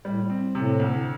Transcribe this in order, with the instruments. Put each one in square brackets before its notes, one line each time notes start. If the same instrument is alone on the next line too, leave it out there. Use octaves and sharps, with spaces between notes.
[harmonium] A2 [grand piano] G3
[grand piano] C4
[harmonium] A2 [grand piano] C3
[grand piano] D2